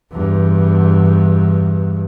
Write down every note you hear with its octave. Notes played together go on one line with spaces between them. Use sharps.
E2 G2